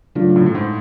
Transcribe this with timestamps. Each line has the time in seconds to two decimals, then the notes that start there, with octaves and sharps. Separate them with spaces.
0.15 G2 C#3 F#3 A3 D4 F4
0.36 A2
0.46 A2
0.55 G#2